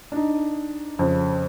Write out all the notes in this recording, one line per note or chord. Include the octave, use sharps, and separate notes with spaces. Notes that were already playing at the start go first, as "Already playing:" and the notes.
D4 D#4
F2 C#3